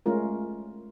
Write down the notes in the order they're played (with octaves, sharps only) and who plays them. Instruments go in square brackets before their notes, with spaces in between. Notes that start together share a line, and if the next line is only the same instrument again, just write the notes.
[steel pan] G#3 A3 C#4 F4 A#4